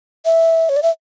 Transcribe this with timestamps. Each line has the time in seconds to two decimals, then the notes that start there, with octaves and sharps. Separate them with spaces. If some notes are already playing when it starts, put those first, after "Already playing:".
0.25 E5
0.69 C#5
0.76 D5
0.83 E5